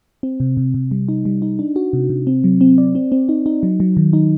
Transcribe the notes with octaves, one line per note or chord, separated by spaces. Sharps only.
C4
C3
C3
C3
G3
D#4
G3
D#4
D4
F#4
C3
C3
C4
F#3
C4
D5
C4
C4
D#4
D#4
F#3
F#3
D#3
D#4